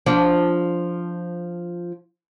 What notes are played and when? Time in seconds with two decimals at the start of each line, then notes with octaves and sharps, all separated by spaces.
0.06 F3 D4